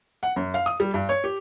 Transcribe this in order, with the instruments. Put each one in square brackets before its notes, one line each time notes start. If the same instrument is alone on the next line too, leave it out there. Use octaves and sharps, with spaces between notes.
[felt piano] F#5
F#2
F5
D#6
G3
G2
C#5
G4